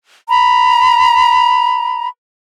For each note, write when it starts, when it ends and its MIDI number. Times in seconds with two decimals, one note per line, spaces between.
0.29 2.07 82
0.29 2.07 83